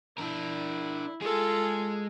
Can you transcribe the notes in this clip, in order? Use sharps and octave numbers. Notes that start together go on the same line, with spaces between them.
D4 E4 A#4
G#3 F4 G#4 A4